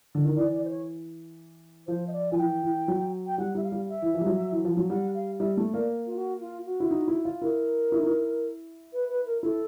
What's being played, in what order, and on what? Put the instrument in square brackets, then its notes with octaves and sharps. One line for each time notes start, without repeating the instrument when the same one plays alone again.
[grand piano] D3
D#3
[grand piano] E3 [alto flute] D5
[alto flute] D5
C5
C#5
[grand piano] F3 [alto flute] C5
[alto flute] D#5
D5
[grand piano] F3 [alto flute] G#5
[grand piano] E3 [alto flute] G5
[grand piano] E3
F#3
[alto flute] G5
[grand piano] G3 [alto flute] F#5
[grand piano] G3 [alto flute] E5
[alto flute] F5
[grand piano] G3
[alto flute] E5
[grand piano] E3
F3
G3
F#3
E3
F3
F#3
[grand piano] G3 [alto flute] F#5
[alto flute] F5
[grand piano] G3 [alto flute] E5
[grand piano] A3
[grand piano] A#3 [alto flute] D5
[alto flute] F4
F#4
F4
F#4
[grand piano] E4
D#4
E4
F4
[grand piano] E4 [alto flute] A#4
[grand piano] E4
D#4
E4
[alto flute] B4
B4
A#4
[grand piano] E4 [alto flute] A4